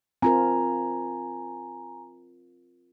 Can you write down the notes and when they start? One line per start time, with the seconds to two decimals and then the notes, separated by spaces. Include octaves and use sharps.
0.22 C4 F4 A#4 G#5 A#5